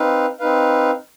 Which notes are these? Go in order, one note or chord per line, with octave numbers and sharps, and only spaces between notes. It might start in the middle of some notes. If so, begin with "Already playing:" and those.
Already playing: C4 D#4 B4 F5
C4 D#4 B4 F5